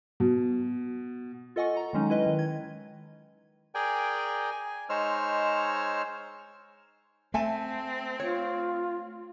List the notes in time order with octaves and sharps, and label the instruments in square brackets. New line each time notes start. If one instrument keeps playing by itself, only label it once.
[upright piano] B2
[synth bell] F4 A4 D#5 F#5 G#5 C#6
A#5
D#3 F#3 G#3 C#4 D#4
E4 B4 D#5
D#3
G#6
[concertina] G#4 A#4 D5 G5 G#5
G#5
G#3 D#4 C5 C#5 E6 F6
[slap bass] A3 [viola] C4 [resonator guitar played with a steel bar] E5 G#5 A5
[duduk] F4 [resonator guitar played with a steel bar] C#5